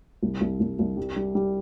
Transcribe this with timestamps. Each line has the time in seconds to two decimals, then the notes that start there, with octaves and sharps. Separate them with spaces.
0.23 C2
0.41 C2
0.60 C2
0.79 C2
0.97 G3
1.16 G3
1.35 G3